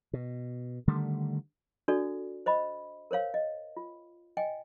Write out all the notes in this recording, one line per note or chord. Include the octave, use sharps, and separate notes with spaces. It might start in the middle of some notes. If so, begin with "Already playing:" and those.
B2
D3 D#3 G3 A3
D4 F#4 A4 D5
C5 D#5 B5
A#4 C5 C#5 F5
D#5
F4
D#5 G5 G#5